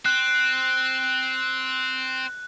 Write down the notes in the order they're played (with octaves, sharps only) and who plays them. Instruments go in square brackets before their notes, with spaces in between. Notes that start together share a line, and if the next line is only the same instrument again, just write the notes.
[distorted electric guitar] C4 [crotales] F#6